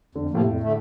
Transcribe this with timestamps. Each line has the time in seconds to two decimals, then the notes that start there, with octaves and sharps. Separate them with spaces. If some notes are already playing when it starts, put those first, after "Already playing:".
0.15 F2 D3
0.30 A2 C3 F3 A#3
0.45 F2
0.60 D3 A3